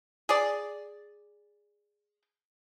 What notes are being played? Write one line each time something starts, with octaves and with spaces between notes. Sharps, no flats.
G#4 D5